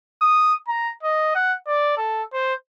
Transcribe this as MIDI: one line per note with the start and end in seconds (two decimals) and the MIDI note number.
0.22 0.55 87
0.68 0.92 82
1.03 1.35 75
1.35 1.55 78
1.67 1.96 74
1.97 2.23 69
2.33 2.54 72